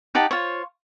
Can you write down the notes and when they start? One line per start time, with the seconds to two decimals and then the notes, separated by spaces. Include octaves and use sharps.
0.15 D#4 G4 F#5 A5
0.31 F4 C5 C#5